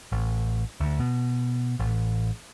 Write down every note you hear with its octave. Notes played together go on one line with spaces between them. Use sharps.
A1
D2
B2
A1